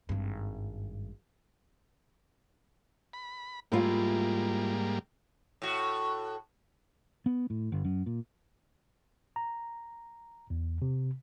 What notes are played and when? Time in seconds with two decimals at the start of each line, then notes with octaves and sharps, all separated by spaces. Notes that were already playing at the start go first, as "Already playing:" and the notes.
0.09 G#1 G2
3.13 B5
3.72 G#2 G3 A3 A#3 E4 F4
5.62 A2 F#4
7.26 B3
7.50 A2
7.72 G1
7.84 F#2
8.06 A#2
9.36 A#5
10.50 E2
10.82 C3